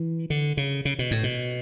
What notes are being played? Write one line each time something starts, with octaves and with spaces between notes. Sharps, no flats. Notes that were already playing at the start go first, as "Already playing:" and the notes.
Already playing: E3
D3
C#3
C#3
B2
A2
B2